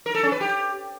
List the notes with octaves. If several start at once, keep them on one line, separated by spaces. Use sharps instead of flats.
A#4
A4
C#4
B4
G4